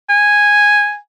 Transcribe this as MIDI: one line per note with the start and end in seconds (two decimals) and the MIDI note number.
0.09 0.97 80